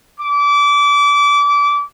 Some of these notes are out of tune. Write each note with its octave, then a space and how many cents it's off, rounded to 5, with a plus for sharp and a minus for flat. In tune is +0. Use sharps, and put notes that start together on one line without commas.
D6 -25